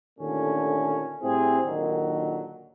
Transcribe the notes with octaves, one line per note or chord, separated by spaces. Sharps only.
D#2 A#2 D3 A3 C#4
A2 G3 C4 E4 G#4
D#2 A#2 D3 D#3 F#3